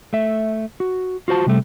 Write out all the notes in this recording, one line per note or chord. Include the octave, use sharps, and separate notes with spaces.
A3 E5
F#4
F4 F#4 C5 A5
C3 G3 A3